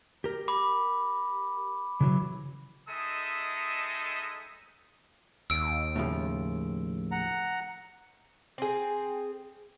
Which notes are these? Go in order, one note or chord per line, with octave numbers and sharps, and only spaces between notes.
G4 A#4
B5 D6
C#3 E3 F#3
G#3 D#4 A4 E5 D#6
D#2 E6 D7
A2 C#3 F3
F#5 A#5
C4 G#4